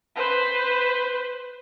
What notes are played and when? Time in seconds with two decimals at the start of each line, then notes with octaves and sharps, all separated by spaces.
0.16 B4 C5